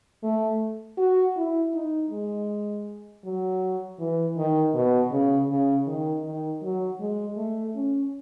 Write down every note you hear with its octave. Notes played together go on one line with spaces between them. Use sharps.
A3
F#4
E4
D#4
G#3
F#3
E3
D#3
B2
C#3
C#3
D#3
D#3
F#3
G#3
A3
C#4